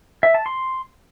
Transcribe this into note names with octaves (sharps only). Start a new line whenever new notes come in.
E5
A5
C6